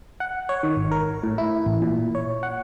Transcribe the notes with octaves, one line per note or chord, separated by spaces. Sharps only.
F#5
C#5
D#3
G#1
A#4
A2
E4
A1
A#2
C#5
F#5